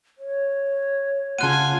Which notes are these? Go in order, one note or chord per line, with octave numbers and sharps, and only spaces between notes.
C#5
C#3 F4 F#5 G#5 A5 F#6 D#7